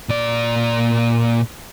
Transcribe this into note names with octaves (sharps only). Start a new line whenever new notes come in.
A#2 D5